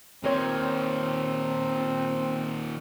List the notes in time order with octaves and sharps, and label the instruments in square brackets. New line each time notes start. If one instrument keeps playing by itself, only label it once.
[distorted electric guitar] A#2 D#3 [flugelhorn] C4 [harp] A#4 C5 C#5